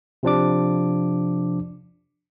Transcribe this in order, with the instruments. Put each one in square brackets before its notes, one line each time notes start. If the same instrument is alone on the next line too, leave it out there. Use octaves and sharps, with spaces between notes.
[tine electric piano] C3 F3 D4 D6